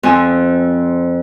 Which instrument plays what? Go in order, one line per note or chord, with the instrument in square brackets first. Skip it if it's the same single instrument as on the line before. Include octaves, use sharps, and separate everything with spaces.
[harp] F2 F3 G#5 E6